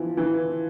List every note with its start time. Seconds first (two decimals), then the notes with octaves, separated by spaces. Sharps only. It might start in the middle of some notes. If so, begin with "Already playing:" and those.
Already playing: E3 F3
0.17 E3